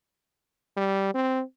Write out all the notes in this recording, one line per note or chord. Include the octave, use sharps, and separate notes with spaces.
G3
C4